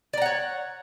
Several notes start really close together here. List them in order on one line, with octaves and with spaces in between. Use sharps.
D5 A#5 F#5 C#5